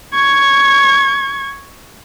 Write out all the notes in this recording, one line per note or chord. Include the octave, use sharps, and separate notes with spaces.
C#6 G#6